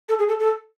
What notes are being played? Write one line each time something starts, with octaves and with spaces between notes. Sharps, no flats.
A4
G#4
A4
A4